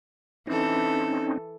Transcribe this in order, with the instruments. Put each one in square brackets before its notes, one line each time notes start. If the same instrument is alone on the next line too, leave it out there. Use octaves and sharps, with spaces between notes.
[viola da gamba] E3 A4 [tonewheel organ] C4 C#4 D#4